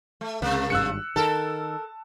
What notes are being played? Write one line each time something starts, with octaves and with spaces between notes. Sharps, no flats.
A3
C#2 C3 A#3
G#1 G2 E6 F#6 C#7
D#3 A4 A#4 A5